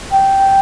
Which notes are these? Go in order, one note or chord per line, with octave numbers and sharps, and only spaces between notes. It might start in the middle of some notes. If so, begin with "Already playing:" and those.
G5